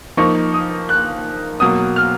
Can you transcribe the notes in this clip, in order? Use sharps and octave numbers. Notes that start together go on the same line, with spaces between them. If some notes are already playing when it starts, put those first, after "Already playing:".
F3 A#3 D#4 C#6
D#6
F#6
B2 F#3 A#3 D#6
F6